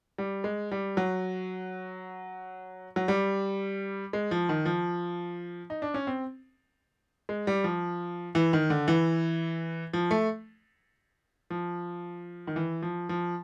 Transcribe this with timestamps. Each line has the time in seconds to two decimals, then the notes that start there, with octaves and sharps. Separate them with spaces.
0.18 G3
0.44 G#3
0.72 G3
0.97 F#3
2.96 F#3
3.08 G3
4.13 G#3
4.31 F3
4.49 D#3
4.66 F3
5.70 D#4
5.82 D4
5.94 C#4
6.07 C4
7.29 G#3
7.47 G3
7.64 F3
8.35 E3
8.53 D#3
8.70 D3
8.88 E3
9.93 F3
10.11 A3
11.50 F3
12.47 D#3
12.56 E3
12.82 F3
13.09 F3